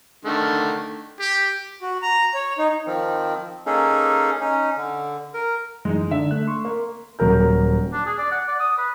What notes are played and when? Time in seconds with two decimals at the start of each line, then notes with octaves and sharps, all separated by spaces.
0.25 D3 D#3 A3
1.20 G4
1.82 F#4
2.02 A#5
2.34 C#5
2.58 D#4
2.87 D#3 F3 C4
3.66 A#3 C#4 D#4 G#4 A4
4.40 C#4 D#4
4.77 D3
5.34 A#4
5.85 F#2 E3 G#3 D#4
6.11 D3 D4 E5
6.31 A3 F#6
6.48 C6 C#6
6.65 A#3
7.19 D#1 F#3 A#4 G6
7.93 D4
8.06 G#4
8.18 D5
8.32 F#5
8.48 D5
8.60 D#6
8.78 B4